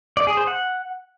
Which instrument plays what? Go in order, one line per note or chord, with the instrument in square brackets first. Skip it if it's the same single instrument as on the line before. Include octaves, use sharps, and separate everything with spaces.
[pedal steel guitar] D5
G#4
C5
F#5